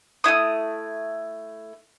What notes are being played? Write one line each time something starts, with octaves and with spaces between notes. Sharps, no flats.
A3 A#3 E4 D#6